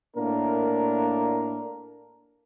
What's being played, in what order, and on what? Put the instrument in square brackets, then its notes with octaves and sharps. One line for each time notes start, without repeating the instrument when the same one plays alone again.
[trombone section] A2 A#3 D4 A#4